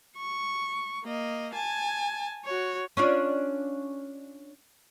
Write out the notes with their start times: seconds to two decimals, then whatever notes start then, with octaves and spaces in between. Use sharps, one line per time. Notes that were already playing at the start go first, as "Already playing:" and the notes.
0.17 C#6
1.04 A#3 D#5
1.54 G#5 A5
2.44 F#4 C#5
2.97 C#4 D4 F4